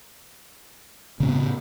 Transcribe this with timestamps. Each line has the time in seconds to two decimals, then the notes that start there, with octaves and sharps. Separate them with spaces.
1.20 C#3
1.23 C4
1.26 A2
1.28 B3